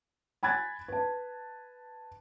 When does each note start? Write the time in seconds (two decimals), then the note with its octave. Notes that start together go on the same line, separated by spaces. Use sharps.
0.43 G#5 B5 F#6 G#6 A6
0.88 B4 A5